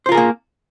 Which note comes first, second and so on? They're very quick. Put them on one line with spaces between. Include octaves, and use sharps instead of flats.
C5 F4 A#4 G#4 A#3